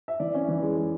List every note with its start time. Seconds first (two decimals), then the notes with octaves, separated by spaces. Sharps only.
0.08 E5
0.20 E3 D5
0.34 C#4
0.48 E3
0.62 G#3
0.77 G#3